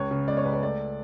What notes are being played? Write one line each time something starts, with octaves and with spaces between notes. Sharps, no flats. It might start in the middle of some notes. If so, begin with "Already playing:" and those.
Already playing: C#2 C#5
C#3
G#3 D5
C#5
C#2 B4
C#5
A3 D5